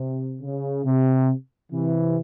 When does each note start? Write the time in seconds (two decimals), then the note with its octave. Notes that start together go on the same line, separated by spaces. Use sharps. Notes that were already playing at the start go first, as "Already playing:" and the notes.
Already playing: C3
0.42 C#3
0.85 C3
1.72 C3 E3